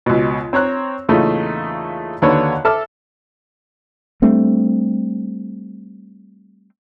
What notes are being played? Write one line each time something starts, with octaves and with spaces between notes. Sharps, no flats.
C#2 B2
C4 C#5 A#5 F#6
E2 A#2 C#3 A3 D#4
D#2 D3 F#4 B4 C#5 F#5
A4 E5 A5 D6 F6
G3 A3 C4 D4